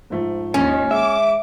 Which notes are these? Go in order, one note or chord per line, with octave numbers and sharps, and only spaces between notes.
G#2 F3 A3
D#2 C#4
G#3 E5 D6